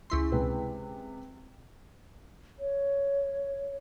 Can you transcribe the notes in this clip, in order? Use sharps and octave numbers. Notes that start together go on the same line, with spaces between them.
C#2 E4 C6
C3 G#3 B4
C#5